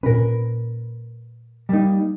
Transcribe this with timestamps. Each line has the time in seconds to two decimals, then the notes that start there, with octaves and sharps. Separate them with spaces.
0.03 A#2 C#4 A#4 B4
1.69 G3 A#3 D#4